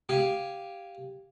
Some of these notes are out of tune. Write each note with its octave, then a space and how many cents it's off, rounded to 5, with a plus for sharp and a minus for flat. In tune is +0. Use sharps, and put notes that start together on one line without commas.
G4 +0 F5 +0 G#5 +0